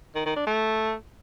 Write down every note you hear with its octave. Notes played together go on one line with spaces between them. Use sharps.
D#3
D#3
D4
A3